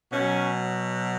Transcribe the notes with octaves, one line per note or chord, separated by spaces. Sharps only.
B2 F#3 C#4